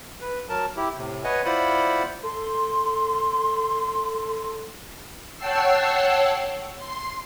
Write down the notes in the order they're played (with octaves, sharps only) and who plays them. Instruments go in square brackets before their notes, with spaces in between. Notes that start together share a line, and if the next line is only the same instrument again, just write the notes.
[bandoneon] B4
F#3 A#4 A5
E4 G4
A2 C3
B4 C#5 D#5 F#5 G#5
E4 F4 C5 D5 F#5 B5
[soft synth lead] A4 [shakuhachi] C6
[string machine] C#5 F#5 G5 A5 E6 C7
C6